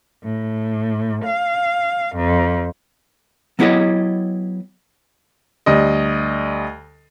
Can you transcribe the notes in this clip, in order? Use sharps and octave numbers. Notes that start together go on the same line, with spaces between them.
A2
F5
F2
F#3 B3 E4 G4 C#5 D#5
D2 G3 D#5